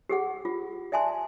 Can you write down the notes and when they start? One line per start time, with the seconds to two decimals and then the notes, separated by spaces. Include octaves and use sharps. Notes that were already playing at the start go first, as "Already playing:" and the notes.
0.09 G4 G#4 F#5
0.45 F4
0.92 D5 E5 G#5 A5 C6